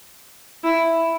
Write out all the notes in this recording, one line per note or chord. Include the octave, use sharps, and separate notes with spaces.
E4